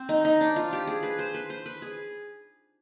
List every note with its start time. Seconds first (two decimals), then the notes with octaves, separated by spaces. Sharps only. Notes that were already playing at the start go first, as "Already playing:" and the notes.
Already playing: C4
0.09 D#4
0.25 D#4
0.41 D4
0.56 F4
0.73 G4
0.87 G#4
1.03 B4
1.19 C5
1.34 B4
1.50 C5
1.66 B4
1.82 G#4